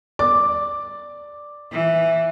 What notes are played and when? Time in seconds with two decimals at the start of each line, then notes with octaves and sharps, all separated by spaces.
0.19 D5 D6
1.72 E3